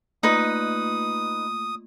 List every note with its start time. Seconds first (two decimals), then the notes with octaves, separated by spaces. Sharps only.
0.23 A3 A#3 D#4 F4 B4 D#6